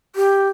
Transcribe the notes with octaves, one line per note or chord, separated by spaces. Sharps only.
G4